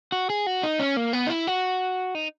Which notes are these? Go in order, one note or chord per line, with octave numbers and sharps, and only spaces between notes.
F#4
G#4
F#4
D#4
C#4
A#3
B3
D#4
E4
F#4
D#4